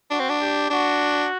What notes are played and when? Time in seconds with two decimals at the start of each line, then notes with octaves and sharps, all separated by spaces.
0.11 D4 F#4
0.20 C4
0.29 D4
0.41 G4
0.70 D4 F#4